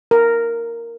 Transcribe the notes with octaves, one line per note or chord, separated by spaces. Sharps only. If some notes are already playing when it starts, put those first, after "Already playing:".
A#4